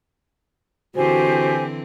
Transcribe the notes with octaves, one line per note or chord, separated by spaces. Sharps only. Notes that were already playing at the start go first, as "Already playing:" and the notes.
D3 E3 C4 F#4 G4 C5 G#5